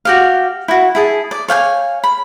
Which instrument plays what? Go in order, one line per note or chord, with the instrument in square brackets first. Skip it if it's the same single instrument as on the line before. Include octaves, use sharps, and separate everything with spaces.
[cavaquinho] F#4 G4 F5
E4 F#4
E4 G#4 A5
D5
C#5 F5 G5 G#5
B5